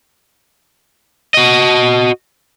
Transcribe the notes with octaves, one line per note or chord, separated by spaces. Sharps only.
F#4 D#5